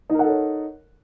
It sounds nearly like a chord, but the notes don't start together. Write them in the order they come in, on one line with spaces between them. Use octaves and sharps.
D#4 A#4 F#5 A4 C#5